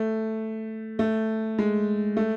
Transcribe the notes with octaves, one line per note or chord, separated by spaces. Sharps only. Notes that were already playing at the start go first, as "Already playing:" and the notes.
Already playing: A3
A3
G#3
A3